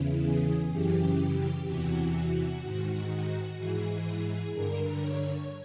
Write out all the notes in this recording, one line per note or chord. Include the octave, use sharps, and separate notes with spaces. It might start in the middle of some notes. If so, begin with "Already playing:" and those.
Already playing: E2 C#3 E3
G#4
F#2 C#3 E3 G4
E2 C3 E3 F#4
F#4
G#2 D#3
G#2 E3 G#4
G2 D3 A#4
C#5